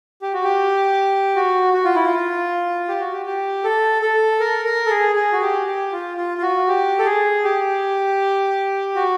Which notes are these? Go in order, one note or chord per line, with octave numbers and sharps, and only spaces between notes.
G4
F#4
G4
F#4
F#4
F4
E4
F4
G4
F#4
G4
G4
A4
A4
A#4
A#4
A4
G#4
G#4
F#4
G4
G4
F4
F4
F4
F#4
G4
A4
G#4
G4
F#4